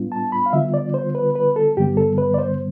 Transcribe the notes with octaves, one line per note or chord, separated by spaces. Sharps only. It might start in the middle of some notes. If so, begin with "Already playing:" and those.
Already playing: A2 G3 B3 D4 F4
A5
B5
F5
D3 G3 B3 F4 E5
D5
C5
B4
B4
A4
G2 D3 G3 B3 G4
A4
B4
D5
C5